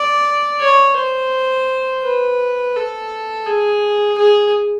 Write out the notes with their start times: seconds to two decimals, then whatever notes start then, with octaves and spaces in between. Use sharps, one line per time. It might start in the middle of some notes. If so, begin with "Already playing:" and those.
Already playing: D5
0.60 C#5
0.96 C5
2.03 B4
2.75 A4
3.46 G#4
4.18 G#4